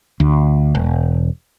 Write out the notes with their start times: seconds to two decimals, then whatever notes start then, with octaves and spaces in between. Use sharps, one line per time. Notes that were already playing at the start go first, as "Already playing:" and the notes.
0.20 D2
0.75 E1